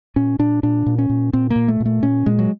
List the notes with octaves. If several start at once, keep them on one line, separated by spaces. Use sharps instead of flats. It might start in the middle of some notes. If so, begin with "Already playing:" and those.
A#2 C#4
A#2 D4
A#2 D4
A#2
C#4
A#2
A#2 C4
A#3
A#2
A3
A#2
A3
A#2 C#4
A#2 G#3
F#3